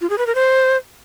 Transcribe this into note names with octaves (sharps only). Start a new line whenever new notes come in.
F4
G#4
B4
A#4
C5